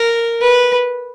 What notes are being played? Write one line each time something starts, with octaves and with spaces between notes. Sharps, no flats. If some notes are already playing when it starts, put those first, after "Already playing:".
Already playing: A#4
B4